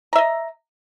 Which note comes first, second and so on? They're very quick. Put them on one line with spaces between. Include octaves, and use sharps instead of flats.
A#5 E5 D#5